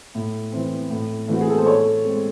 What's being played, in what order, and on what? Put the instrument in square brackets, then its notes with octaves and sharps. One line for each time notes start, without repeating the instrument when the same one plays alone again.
[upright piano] A2
E3 C4
A2
E3 A3 C4 F#4
G#4
A4
C5
A2 A4 C#5
G#3 C4